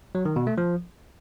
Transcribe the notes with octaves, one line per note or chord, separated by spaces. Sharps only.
F#3
D#3
B2
A3
F3